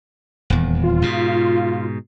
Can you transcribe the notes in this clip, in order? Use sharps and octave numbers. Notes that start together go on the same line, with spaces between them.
D#1 E2
F4
G#2 B2